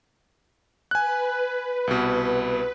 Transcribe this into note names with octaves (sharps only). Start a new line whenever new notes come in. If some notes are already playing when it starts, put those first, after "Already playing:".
B4 G#5 F#6
C2 B2